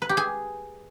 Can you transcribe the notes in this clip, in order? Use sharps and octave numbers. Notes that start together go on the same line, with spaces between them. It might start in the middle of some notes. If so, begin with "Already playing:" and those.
B4
G4
G#4